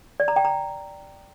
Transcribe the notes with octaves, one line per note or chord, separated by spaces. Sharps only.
D5
A#5
G5
A#5